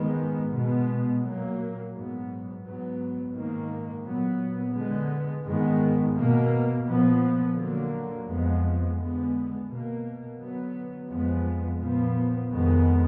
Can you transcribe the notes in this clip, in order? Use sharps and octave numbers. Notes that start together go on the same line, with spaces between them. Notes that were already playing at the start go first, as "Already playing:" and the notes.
Already playing: G#2 D#3 G#3 B3
B2 G#3 B3
A#2 F#3 A#3
G#2 F#3 B3
G#2 F#3 B3
G#2 D#3 A#3
A#2 F#3 B3
D3 G#3 B3
G#2 D#3 G#3 B3
B2 A#3
A#2 F3 B3
D3 F#3 A#3
F2 F3 G#3 B3
D3 G#3 B3
B2 A#3
D3 F#3 B3
F2 F3 G#3 B3
A#2 F3 B3
F2 D#3 G#3 B3